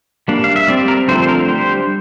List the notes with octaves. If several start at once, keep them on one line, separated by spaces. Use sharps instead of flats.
G3 A#3 D4
F5
E5
G3 C4 D5
A#4
D3 F3 A3 C4 C5
C5
A#4
G3 D4 C5